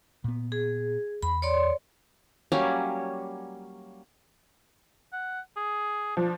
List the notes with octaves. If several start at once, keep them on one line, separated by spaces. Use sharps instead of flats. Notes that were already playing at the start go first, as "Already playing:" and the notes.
A#2 B3
G#4
E2 B5
C#5 D5 C6
F#3 G3 A#3 C#4
F#5
G#4
F3 D4